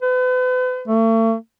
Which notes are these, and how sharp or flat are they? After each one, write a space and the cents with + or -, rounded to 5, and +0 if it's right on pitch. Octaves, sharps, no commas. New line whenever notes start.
B4 +40
A3 +40